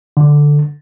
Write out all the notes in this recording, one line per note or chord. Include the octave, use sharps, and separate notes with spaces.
D3